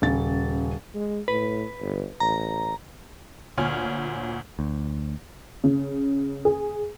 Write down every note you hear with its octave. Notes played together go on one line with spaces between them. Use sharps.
D#1 C#3 A6
G#3
A2 B4
G1
A1 A#5
D2 A#2 C#5 G#5 F6
D2
C#3
G#4